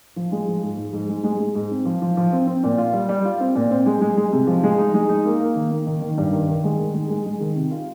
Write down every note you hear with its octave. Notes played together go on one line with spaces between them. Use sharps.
F3
G#3
F3
G#2
G#2
G#2
G#3
G#3
G#3
G#2
C4
F3
F3
F3
C4
C4
A#2
F4
G3
G3
F4
C4
A#2
C4
G#3
G#3
G#3
C3
F3
G#3
D#4
G#3
D#4
A#3
A#3
D#3
A#3
D#3
D#3
G2
D#3
D#3
G#3
D#3
G#3
G#3
G#3
D#3
C3
F4